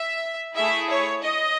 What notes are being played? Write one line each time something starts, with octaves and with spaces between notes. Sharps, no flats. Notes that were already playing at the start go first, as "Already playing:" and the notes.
Already playing: E5
A3 E4 G#4 E5
C#5
D#5